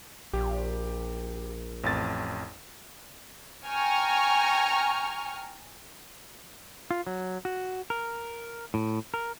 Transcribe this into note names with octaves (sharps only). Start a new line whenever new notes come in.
A#1 G4
A1 F2 A6
G5 G#5 A#5 C#6 F6
F4
F#3
F#4
A#4
A2
A#4